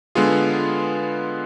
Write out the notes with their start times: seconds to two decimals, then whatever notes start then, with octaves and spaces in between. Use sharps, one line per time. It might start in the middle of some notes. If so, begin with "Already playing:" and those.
0.15 D3 G#3 B3 F4 G#4